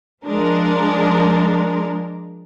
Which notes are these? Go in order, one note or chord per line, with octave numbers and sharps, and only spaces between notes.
F3 G#3 D4 A#4